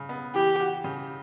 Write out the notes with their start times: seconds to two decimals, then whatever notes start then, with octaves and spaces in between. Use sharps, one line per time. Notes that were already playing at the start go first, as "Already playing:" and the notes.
Already playing: C#3
0.09 B3
0.35 E3 G4
0.60 F#4
0.84 C#3